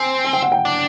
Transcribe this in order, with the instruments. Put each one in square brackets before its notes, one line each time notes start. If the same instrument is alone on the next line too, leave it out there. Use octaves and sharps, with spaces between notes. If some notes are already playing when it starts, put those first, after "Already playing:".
Already playing: [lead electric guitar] C4 [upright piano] G#5
[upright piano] G#5
G5
F#5
G5
[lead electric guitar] D4